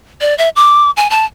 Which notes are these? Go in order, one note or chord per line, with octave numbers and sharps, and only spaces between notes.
D5
E5
D6
G#5
A5